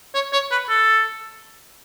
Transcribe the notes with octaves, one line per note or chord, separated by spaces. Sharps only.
C#5
C#5
B4
A4